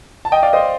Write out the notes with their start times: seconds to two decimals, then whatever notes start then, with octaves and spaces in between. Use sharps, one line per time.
0.25 A5
0.32 D#5 G5
0.43 D5 F5
0.53 C5 D#5